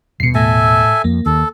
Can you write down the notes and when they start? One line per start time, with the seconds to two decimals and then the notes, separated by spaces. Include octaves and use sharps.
0.20 D#1 B2 C7 C#7
0.35 A2 A4 E5 G#5
1.04 F2 A#3
1.26 D#2 A4